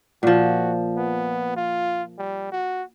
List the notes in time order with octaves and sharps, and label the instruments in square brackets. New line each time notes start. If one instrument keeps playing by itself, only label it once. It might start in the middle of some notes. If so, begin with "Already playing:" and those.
[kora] A#2 F3 [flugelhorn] F#4
[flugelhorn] B3
F4
G3
F#4